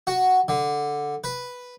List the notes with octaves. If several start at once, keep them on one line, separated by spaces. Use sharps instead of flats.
F#4
D3
B4